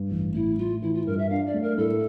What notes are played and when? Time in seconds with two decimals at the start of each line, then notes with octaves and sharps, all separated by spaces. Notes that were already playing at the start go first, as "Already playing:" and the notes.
Already playing: G2
0.11 A1
0.34 A2 E4
0.58 A2 F4
0.82 E3 E4
0.94 F4
1.06 G2 A#4
1.18 E5
1.30 D4 F5
1.47 D5
1.54 A3
1.62 A#4
1.78 A2 A4